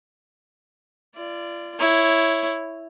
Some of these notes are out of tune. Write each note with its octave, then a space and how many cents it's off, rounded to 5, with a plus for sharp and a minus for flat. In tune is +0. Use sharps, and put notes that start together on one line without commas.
F4 -35 D5 +0
E4 +0 C#5 +0